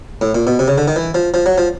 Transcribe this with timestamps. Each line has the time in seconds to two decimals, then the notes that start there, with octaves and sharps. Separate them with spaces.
0.21 A2
0.35 A#2
0.47 B2
0.59 C3
0.68 C#3
0.78 D3
0.88 D#3
0.96 E3
1.15 F3
1.34 F3
1.46 F#3
1.58 F3